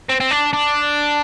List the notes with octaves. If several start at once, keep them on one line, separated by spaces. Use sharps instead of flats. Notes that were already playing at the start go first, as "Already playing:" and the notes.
C4
C4
D4
D4